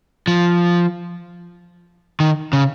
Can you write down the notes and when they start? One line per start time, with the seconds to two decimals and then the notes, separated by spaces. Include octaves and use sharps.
0.28 F3
2.20 D#3
2.53 C#3